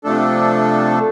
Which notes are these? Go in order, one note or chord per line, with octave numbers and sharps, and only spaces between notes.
C3 F3 A3 D4 A4